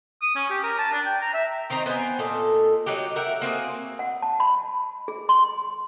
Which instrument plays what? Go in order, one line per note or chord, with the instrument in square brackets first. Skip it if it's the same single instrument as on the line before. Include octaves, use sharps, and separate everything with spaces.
[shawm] D#6
C#4
G4
A#4
A5
D4
G5
A#5
E5
[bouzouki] D#3 C4 D#4 A#5
B3 C5 G5 G#5
A#2 A4 D#5
F#3 D#4 F#4 G4
A#4 E5 F#5 G5
A#3 C4 F#4 G#4
[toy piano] F#5
A5
B5
G#4
C6